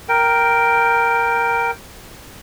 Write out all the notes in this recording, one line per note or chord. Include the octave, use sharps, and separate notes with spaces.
A#4 G5